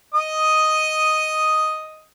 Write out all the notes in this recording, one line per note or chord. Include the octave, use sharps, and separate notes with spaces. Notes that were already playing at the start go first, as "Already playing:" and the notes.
D#5 D#6